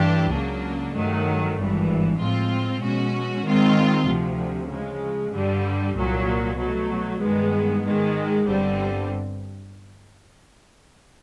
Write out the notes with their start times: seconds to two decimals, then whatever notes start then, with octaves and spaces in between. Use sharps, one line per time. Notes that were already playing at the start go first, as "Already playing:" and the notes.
Already playing: G2 E3 A3 D4 G4
0.30 C#2 C#3 F#3 A#3 D4
0.93 G2 D#3 F#3 A3
1.55 G#1 G2 E3
2.18 A2 F3 G#3 C4 F4
2.81 B2 G#3 C#4 F#4
3.44 D#3 G#3 C4 F4
4.07 D2 C3 F3
4.69 C#3 F3 G#3
5.32 G2 D3 G3
5.95 C2 A#2 F#3
6.57 B2 F#3 A3
7.20 G2 D#3 G#3 B3
7.83 G#2 D#3 G#3
8.46 G1 G2 D3 G3 C4